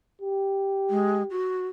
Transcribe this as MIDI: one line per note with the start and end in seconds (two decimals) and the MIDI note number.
0.21 1.32 67
0.90 1.23 56
1.30 1.67 66